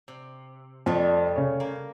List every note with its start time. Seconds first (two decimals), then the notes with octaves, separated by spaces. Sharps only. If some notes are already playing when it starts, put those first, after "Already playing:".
0.08 C3
0.86 F2 G3 A3
1.36 C#3 C#5
1.60 A#3